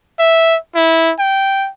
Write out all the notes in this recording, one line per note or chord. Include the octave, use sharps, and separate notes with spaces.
E5
E4
G5